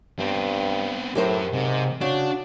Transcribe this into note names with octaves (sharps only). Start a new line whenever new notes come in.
G2 B3 C4
F#2 A2 F#3 G4 A#4 C5
G#2 C3
C#3 D4 F#4